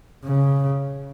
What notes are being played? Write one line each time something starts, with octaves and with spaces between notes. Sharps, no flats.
C#3